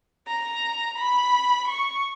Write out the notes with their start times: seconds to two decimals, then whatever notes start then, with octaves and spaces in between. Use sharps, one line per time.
0.28 A#5
0.98 B5
1.68 C#6